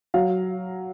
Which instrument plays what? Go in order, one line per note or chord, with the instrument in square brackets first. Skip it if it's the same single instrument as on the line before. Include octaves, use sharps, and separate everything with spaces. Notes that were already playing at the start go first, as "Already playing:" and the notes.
[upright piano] F#3 F5